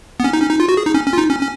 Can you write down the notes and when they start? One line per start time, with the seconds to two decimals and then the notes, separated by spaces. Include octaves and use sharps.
0.20 B3
0.24 C#4
0.33 D#4
0.42 C#4
0.51 D#4
0.60 F4
0.69 F#4
0.77 G#4
0.86 D#4
0.94 C#4
1.07 C#4
1.13 F4
1.18 D#4
1.30 C#4
1.41 C#4